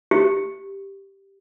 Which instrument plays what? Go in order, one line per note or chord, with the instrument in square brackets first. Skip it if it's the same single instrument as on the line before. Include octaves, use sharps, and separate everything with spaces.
[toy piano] G4